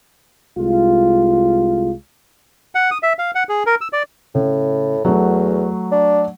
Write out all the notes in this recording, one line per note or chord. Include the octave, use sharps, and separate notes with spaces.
C2 G#3 F4
F#5
D#6
E5
F5
F#5
G#4
A#4
E6
D5
A2 C#3
E2 F#3 A3
D4